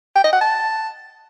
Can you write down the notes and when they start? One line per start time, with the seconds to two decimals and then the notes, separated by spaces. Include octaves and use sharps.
0.15 G5
0.24 D#5
0.33 F#5
0.41 A5